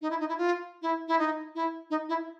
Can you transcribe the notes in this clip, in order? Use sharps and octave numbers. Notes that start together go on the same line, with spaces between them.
D#4
E4
D#4
E4
F4
E4
E4
D#4
E4
D#4
E4